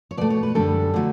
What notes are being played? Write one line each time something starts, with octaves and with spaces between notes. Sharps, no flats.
C#5
B2 A3 D5
C#5
B4
F#2 D3 G3 A4
D3 F#3 A3